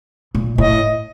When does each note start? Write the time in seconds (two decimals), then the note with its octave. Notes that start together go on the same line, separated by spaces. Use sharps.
0.35 A#2
0.58 A2 D#5